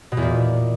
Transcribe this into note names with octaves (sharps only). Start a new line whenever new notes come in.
B2
E2
A#2